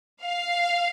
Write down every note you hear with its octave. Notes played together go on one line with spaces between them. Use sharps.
F5